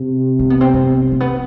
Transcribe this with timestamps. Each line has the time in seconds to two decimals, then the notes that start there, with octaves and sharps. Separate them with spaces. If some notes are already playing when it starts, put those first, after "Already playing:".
Already playing: C3
0.39 C4
0.50 B3
0.61 C4
0.74 B3
1.12 A#3
1.20 B3